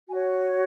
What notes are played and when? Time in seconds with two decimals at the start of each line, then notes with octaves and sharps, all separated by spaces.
0.08 F#4 C#5 G#5